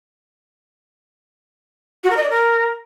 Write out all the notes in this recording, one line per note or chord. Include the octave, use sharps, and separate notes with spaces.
F#4
A#4
D#5
D5
A#4